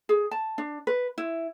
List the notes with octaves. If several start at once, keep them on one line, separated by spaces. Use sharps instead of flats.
G#4
A5
D4
B4
E4